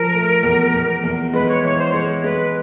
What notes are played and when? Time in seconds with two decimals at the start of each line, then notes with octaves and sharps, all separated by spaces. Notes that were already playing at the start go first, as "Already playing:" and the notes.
Already playing: F3 A#4
0.13 A3
0.43 E2
0.73 E2
1.03 E2
1.33 G#3 B4
1.48 C#5
1.63 E3 C#5
1.79 C5
1.94 G#3 C#5
2.24 G#3 B4